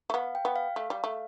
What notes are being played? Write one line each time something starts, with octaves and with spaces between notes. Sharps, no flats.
A3
B3 F5
G5
B3
F5
A3
G3
A3